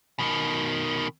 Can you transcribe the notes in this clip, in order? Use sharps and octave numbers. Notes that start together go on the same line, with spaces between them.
B2 D#3